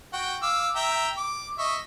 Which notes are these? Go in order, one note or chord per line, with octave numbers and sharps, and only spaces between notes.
F#4 G5
F5 D6 E6
E5 G5 A#5
D6
D#5 E5 C#6